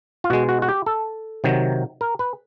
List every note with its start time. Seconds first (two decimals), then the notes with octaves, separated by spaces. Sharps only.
0.24 F4
0.30 B2 G#3 F#4
0.49 F#4
0.62 F#4
0.69 G4
0.86 A4
1.44 C3 D#3 F#3
2.01 A#4
2.19 B4